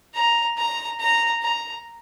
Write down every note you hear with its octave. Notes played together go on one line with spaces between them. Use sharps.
A#5
A#5
A#5
A#5